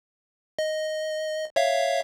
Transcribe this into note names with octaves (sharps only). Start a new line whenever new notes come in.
D#5
C#5 E5 F5